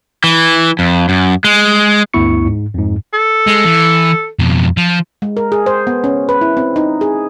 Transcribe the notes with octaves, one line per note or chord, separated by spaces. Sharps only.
E3
F2
F#2
G#3
D2 G2 B3 E4 C#6 C#7
G#2
F2 G#2
A4
G#3
E3
F2 B2
F3
G#3
A#4
G#4
C5
B3
C#4
B4
E4
C4
D#4
G#4